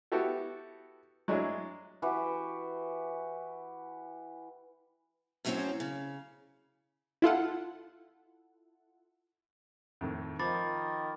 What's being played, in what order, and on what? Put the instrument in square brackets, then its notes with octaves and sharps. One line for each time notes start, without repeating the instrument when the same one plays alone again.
[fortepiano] B3 E4 F#4 G4 A4
F#3 G#3 D4 E4 G#4
[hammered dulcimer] E3 F#4 G4
[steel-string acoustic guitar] F#2 A2 F#3 G#3 C4 C#4
C#3
[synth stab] E4 F4 A4 F#5
[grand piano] F2 A2 D#3
[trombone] D#3 [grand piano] F3 [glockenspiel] B5 D6 A6